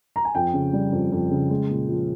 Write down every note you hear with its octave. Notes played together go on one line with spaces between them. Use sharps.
A#5
G#5
F2 G5
C#3
G3
F2
F2
C#3
G#3
A#2
F3